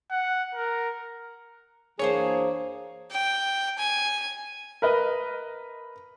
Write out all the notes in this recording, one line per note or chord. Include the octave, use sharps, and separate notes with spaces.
F#5
A#4
F#2 E3 A#3 D4 G#4 C5 C#5
G5
G#5
A#4 B4 D#5